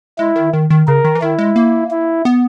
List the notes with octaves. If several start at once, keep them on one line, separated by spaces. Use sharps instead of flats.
G#3 E4
D#3
D#3
D#3
C#3 A#4
D#3
E3
D#3 E4
G#3
A#3
E4
B3